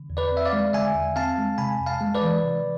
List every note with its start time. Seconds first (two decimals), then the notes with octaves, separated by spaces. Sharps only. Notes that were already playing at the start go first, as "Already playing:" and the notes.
Already playing: D3
0.10 E2
0.17 B4 D5
0.32 C4
0.37 E5
0.46 D5 F5
0.53 G#3
0.73 D3 E5 G#5
0.95 E2
1.16 C4 F5 A5
1.38 G#3
1.58 C3 G#5 B5
1.80 F2
1.86 F5 A5
2.00 G#3
2.15 B4 D5
2.21 E3
2.43 C3